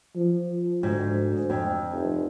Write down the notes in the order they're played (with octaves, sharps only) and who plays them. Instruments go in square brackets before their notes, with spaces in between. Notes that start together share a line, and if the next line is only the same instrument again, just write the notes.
[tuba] F3
[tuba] D2 [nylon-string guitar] G#2
[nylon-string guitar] F2
[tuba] F1